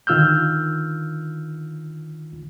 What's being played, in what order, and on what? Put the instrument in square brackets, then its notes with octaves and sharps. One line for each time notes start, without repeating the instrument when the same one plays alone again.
[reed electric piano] D3 D#3 F4 E6 F6 G6